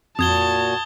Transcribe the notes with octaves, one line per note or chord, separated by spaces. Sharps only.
F2 A#2 F#4 A5 D#6 G#6 G7